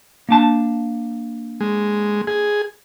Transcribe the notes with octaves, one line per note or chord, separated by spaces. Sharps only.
A#3 D4 A5
G#3
G#4